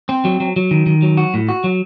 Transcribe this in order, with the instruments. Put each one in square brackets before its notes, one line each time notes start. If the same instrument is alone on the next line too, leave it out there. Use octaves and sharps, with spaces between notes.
[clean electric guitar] C4
F#3
F#3
F#3
D#3
D#3
F#3
F#4
A2
F#4
F#3